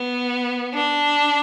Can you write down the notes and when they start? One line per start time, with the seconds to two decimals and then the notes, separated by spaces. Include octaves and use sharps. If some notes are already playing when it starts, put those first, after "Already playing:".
Already playing: B3
0.74 D4